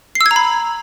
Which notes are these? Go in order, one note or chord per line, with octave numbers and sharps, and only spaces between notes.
C7
E6
G#6
A#5
B5